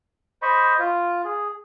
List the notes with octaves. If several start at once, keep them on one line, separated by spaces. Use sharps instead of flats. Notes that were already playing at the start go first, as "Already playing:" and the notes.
C5 D#5 B5 C#6
F4
G#4